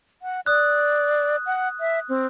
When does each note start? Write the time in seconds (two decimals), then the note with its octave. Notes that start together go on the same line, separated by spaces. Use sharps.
0.22 F#5
0.46 D5 D#6 F#6
1.46 F#5
1.80 E5
2.09 C4